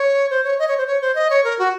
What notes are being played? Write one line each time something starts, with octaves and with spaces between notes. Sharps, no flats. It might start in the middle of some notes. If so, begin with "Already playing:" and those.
Already playing: C#5
C5
C#5
D#5
C#5
C5
C#5
C5
D#5
C#5
A#4
F#4